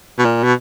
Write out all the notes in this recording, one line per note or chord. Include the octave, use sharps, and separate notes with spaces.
B2
A#2
B2